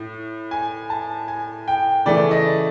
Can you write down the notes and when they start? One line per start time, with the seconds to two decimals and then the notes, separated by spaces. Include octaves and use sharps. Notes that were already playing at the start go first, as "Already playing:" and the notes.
Already playing: A2
0.51 G#5
0.90 A5
1.28 G#5
1.68 G5
2.06 C#3 E3 A3 D5
2.31 D#5